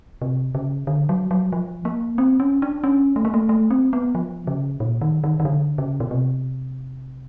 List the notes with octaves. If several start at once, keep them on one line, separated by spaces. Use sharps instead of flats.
C3
C#3
D3
F#3
F#3
F3
A#3
C4
C#4
D4
C#4
A3
A#3
A3
A3
C4
B3
F3
C#3
A#2
D#3
D#3
D#3
D3
C#3
B2
C3